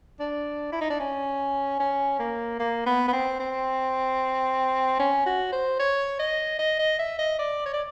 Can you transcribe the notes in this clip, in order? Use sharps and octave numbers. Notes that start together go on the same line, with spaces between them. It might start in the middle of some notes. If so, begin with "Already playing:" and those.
D4
E4
D#4
D4
C#4
C#4
A#3
A#3
B3
B3
C4
C4
C#4
F#4
C5
C#5
D#5
D#5
D#5
E5
D#5
D5
C#5
D5